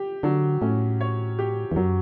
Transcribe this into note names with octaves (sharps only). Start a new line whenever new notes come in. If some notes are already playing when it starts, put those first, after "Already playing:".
Already playing: G4
D3 F#3
A2 C#4
C#5
G4
E2
F#2 F#3